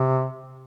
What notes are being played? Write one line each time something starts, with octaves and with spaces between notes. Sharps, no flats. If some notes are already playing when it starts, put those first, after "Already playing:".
Already playing: C3